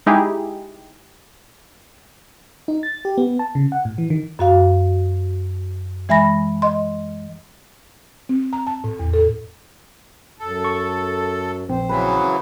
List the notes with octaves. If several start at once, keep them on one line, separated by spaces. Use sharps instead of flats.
G#3 D#4 E4 G4 G#4
D#4
A6
G4
B3
A5
C#3
F#5
A2
E3
D#3
F#2 F#4 F5
E3 G#3 E5 G#5 B5 A#6
D#5 C6
C4
A#5
A5
A2
E2
A4
F#2 A4
C#6
A#1 C4 C5
C#3 E3 F#3 B4